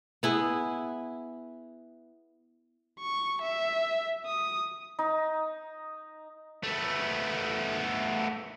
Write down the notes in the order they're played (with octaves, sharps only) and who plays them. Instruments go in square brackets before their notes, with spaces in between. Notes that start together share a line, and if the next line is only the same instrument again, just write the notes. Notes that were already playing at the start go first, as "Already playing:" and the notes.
[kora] B3 E4 G#4
[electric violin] C#6
E5
D#6
[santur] D#4
[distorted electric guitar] A3 B3